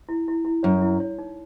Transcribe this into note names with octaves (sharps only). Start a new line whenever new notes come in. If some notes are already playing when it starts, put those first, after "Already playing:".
E4
E4
E4
F#2 C#5
E4
C#5
D#4